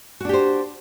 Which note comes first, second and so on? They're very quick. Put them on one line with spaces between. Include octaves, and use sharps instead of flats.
F#4 D4 G4 C5